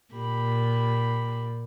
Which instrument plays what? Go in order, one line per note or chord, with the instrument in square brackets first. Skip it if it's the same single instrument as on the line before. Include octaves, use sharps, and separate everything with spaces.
[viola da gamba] A#2 [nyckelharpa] G4 B5